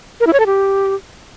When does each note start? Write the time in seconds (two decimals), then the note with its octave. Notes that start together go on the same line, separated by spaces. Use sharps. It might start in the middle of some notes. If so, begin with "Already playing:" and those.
0.20 A#4
0.27 E4
0.33 C#5
0.40 A4
0.46 G4